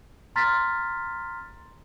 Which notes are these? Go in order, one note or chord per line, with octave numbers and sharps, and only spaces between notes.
A#5 C6 F6 A6 B6